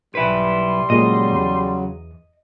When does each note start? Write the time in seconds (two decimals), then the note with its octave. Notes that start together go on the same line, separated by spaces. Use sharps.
0.15 B1 G3 E4 B4 C6
0.90 A#2 C#3 F#3 G#3 D#5
1.33 E2